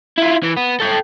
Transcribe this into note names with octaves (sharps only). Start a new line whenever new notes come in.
E4 F4
E3
B3
A4 G5